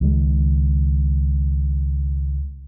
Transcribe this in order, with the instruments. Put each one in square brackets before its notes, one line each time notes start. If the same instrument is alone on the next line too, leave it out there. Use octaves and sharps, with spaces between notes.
[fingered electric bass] C#2 D#3 F3 G#3